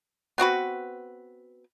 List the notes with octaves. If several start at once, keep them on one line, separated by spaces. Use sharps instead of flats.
B3 C4 F#4 B4